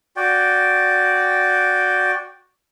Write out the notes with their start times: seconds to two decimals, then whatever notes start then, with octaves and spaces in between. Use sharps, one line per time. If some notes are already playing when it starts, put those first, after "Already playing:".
0.16 F#4 D5 G5